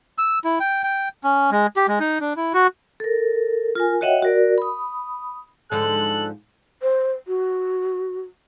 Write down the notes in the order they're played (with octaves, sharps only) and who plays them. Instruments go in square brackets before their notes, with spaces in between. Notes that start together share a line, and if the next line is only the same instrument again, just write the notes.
[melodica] E6
E4
G5
G5
C#4
G#3
G4
G#3
D#4
D4
E4
F#4
[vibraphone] A4 A#4
F4 A#4 G#5
F#4 C#5 D#5 E5 F#5 G5
F#4 A#4 D5
B5 D#6
[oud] G#2 D3 F3 [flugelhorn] A4 [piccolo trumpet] F#6
[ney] C5
F#4